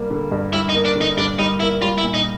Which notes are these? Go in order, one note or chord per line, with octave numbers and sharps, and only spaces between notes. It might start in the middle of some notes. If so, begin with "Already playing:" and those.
Already playing: G2 G3 A#3
D3
G2
G3 E4
D#4
A#3
D4
D3
D#4
G2 D4
G3 D#4
A#3 E4
G3 F4
E4
A#2
D#4